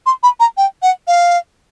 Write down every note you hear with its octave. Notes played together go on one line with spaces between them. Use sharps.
C6
B5
A#5
G5
F#5
F5